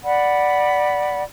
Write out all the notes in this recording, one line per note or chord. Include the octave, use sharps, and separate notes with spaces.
D5 F#5 B5